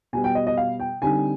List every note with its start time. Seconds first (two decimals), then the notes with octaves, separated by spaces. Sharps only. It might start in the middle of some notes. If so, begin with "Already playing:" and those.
0.13 B2 G3 B3 G#5
0.24 G5
0.35 D#5
0.47 D#5
0.57 F5
0.80 G5
1.02 D3 G3 C4 D#4 G#5